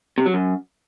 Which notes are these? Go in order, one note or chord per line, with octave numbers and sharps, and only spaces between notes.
C3
F#3
F#2